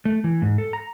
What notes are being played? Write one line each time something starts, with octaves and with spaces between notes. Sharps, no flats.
A3
E3
G#2
A4
A#5